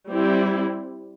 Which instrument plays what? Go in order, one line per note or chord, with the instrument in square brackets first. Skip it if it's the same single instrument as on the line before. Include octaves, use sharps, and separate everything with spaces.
[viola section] G3 C4 E4